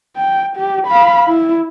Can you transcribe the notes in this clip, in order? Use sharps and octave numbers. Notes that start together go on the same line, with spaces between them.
G5
G4
F5 B5
E4